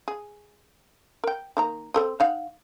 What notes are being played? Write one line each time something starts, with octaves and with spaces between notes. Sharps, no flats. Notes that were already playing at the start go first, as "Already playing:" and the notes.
G#4
A#4 G5
D#3 A#3 A#5
C4 A4 D#5
D#4 F5 F#5